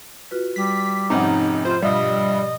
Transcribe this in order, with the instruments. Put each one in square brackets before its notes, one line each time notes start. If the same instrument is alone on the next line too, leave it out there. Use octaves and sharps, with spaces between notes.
[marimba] F4 F#4 B4
[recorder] G3 [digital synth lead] B6
[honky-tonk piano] F1 C3 C#4 [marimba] G#2 F3 F#5 [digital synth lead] D#4
[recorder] F4 [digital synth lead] C5
[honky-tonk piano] G2 F4 E5 [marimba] B2 [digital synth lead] G3 [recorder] D#5